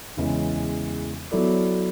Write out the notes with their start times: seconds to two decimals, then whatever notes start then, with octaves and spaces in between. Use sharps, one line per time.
0.17 E2 C#3 E3 G#3
1.31 F#3 B3 E4 A4 D5